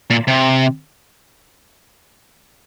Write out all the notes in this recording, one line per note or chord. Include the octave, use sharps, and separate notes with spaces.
A#2
C3